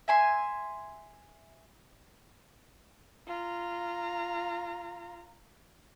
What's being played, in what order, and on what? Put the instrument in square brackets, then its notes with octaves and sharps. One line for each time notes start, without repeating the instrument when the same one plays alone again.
[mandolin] E5 G#5 C6
[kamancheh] F4 A#5